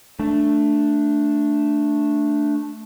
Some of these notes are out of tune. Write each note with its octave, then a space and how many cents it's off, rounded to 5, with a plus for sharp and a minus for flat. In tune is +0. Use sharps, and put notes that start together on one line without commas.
A3 +0 D4 +0